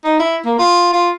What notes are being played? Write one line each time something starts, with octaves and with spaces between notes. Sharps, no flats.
D#4
E4
A#3
F4
F4